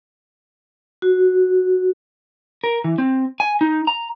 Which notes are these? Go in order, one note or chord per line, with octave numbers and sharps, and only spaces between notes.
F#4
A#4
E3
C4
G#5
D#4
A#5